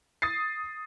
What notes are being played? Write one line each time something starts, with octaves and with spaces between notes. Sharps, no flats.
D#6 A6 C7